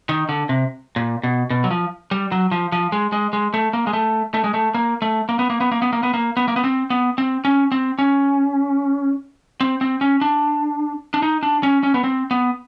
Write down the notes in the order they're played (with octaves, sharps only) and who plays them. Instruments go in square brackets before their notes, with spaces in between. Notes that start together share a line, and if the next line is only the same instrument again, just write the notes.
[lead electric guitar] D#3
D3
C3
A#2
B2
B2
F#3
F3
G3
F#3
F3
F3
G#3
G#3
G#3
A3
A#3
G#3
A3
A3
G#3
A3
A#3
A3
A#3
B3
A#3
B3
A#3
B3
A#3
B3
A#3
B3
A#3
B3
C4
B3
C4
C#4
C4
C#4
C4
C4
C#4
D4
D4
D#4
D4
C#4
C#4
B3
C4
B3